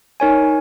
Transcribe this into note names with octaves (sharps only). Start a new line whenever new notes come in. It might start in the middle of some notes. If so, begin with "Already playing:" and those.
D#4 A#4 C#5 G#5